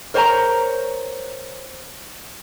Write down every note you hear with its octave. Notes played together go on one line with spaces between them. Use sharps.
A#4 C5 C#5 G#5 A#5